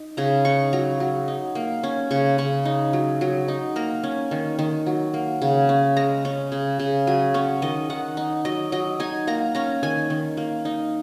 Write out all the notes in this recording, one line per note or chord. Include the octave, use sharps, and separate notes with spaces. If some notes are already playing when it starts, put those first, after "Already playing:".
Already playing: D#4
C#3 A#5
D#4 C#6
F#3 A#5
F#3
D#4
A#3
C#4
C#3 C#6
C#3 C#6
D#4
F#3
F#3
D#4
A#3 A#5
C#4
D#3
D#3
F#3
A#3
C#3
C#4
G#3 A#5
C#4
C#3
C#3
F#3 G#5
C#4 C#5
D#3 D#5
D#3 F#5
D#4
F#3 D#5
F#3 D#5
D#4 G#5
A#3 A#5
C#4 A#5
D#3 G#5
D#3
A#3
D#4